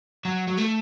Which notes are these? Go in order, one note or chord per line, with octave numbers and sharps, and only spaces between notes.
F#3
F#3
A3